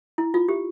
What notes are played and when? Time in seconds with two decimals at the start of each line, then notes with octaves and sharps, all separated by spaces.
0.18 E4
0.34 F4
0.49 G4